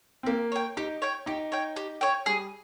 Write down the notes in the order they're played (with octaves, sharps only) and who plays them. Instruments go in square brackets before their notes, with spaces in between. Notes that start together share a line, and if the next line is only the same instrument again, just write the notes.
[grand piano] C4
[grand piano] A#3 [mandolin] G4
[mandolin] C#5 G5
[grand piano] D#4 [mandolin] G4
[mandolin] C#5 G5
[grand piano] D#4 [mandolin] G4
[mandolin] C#5 G5
G4
C#5 G5
[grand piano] G3 [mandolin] G#4